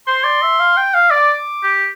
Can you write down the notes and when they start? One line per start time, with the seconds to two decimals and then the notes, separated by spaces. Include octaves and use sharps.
0.07 C5 C6
0.24 D5
0.42 E5
0.60 F5
0.77 G5
0.94 F5
1.11 D5 D6
1.64 G4